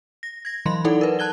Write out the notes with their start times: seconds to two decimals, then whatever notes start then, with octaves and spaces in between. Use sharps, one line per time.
0.23 A#6
0.45 G#6 A#6
0.66 E3 F#3 B5 C6
0.84 D#4 E4 A4 D5 F#5
1.01 A#4 B4
1.19 A5 F#6 G#6 G7